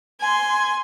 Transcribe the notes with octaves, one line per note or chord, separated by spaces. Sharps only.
G#5 C6